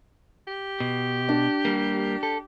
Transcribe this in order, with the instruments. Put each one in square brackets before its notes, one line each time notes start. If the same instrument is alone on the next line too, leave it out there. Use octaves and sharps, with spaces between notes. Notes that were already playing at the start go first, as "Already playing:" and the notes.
[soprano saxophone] G4
[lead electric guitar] B2
[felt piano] D4
[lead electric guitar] G3 A#3
A4